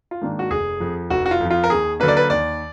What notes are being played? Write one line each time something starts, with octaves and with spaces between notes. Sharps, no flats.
F4
G#2 D#3 A#3 D4
F#4
F1 G#4
F2 F3
F1 F#4
F#4
F4
F2 F3
F4
A#4
D#2 G#4
D3 F#3 A#3 B4
D5
B4
D#2 D5